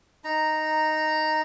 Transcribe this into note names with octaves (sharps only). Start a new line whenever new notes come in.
D#4 A#5